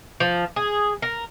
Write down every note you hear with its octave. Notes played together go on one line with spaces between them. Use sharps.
F3
G#4
A#4